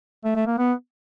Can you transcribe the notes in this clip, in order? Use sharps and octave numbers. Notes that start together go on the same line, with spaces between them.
A3
A3
A#3
B3